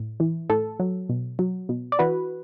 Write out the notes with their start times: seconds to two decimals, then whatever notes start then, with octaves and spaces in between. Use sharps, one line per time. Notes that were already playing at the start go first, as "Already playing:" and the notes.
Already playing: A2
0.20 E3
0.50 A2 A4
0.79 F#3
1.09 B2
1.39 F#3
1.69 B2
1.92 D5
1.99 E3 F#4 B4